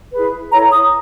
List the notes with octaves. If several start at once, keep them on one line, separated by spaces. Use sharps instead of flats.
E4 G#4 B4
E4 A4 C#5 A#5
D#6